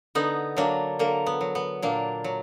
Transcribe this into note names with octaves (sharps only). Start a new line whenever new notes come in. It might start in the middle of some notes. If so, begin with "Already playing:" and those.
D3 B3 D#4
F#3 A#3 D4
D3 A#3
B3
F#3
B3
A#2 A#3 D4
F#3